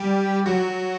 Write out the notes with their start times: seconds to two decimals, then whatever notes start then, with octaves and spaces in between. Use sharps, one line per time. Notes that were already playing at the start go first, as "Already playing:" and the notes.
Already playing: G3 G4
0.46 F#3 F#4